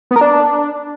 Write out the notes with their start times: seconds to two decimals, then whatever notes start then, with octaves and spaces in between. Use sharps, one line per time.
0.11 B3
0.16 A#4
0.21 D4